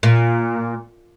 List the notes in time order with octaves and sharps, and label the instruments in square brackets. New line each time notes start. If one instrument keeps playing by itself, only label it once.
[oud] A#2